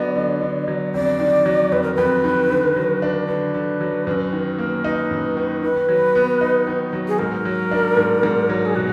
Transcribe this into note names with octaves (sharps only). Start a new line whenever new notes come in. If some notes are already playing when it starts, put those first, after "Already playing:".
Already playing: D3 F#3 B3 D5
D3
D3
F#3
F2 D5
D#3
F#3
F2 B4
A#4
F2 B4
D#3
D3
F#3
D4
D3 B4
D3
F#3
F#2
D#3
A#3
D#4 B4
F#2
D#3
D#3 B4
F#3
B3
D#4
D#3
F#3
G#4
G#2 A#4
F#3
D4
G#2
G#2
F#3
G#4
B2 F#4